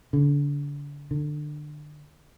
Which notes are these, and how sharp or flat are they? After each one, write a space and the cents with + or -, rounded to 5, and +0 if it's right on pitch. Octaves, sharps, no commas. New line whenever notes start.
D3 -35
D3 +25